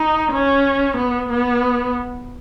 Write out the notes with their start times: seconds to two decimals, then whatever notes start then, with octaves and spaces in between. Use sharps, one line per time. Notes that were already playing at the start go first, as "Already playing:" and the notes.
Already playing: D#4
0.32 C#4
0.97 B3
1.30 B3